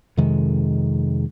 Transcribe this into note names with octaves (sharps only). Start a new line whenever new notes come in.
F2 C3 D#3 G#3